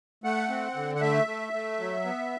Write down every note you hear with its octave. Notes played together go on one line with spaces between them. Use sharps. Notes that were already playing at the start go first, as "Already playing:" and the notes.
A3 F#5
C4
D3
F#5
A3 E5
A3
A3
F#3
B3